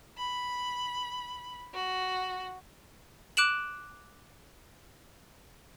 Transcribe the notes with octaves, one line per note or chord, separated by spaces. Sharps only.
B5
F#4
D6 F#6 D7 E7 F#7